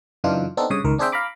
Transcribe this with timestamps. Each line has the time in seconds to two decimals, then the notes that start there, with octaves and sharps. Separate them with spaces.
0.24 F#2 C#3 E3 D4 D#4 F4
0.57 B3 C4 D4 D#4 A4
0.70 G2 C#3 C#5 D#6
0.84 C#2 D#3 A#4
0.98 C4 D4 G#4 C5 E5 G5
1.12 F5 A#5 B5 D6